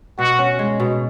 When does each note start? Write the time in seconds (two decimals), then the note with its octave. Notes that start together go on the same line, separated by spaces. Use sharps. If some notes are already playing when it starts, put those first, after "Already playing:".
0.18 B2 F#4
0.39 C#4
0.59 G#3
0.80 B2